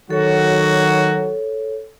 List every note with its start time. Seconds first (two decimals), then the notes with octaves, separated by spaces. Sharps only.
0.10 D#3 F#3 F#4 A4 C#5